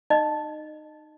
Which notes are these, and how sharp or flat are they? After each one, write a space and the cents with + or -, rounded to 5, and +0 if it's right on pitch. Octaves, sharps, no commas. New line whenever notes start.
D#4 -20 D#5 -25